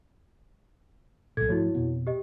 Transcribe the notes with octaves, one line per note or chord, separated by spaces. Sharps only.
B1 A#2 A4 G#6
G#2 F3 A3 E4 F#4 C#5
F2 B2 B3
G4 D#5